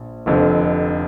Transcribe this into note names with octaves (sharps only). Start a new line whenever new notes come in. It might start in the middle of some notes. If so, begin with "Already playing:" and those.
Already playing: A#1
F1 F2 D3